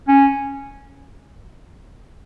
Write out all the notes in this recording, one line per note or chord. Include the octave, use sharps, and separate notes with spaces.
C#4